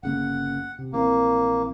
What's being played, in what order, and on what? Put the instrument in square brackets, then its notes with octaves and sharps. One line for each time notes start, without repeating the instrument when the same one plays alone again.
[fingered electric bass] G1 C#3 A#3 [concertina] F#5
[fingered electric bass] C3
[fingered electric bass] A#1 E3 C4 [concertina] A#3